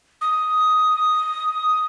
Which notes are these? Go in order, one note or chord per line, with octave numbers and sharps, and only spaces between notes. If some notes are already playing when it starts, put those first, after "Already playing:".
D#6